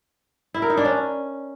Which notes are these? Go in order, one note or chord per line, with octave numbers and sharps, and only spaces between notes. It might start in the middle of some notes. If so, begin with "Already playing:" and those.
E4
A#4
D#4
D4
C#4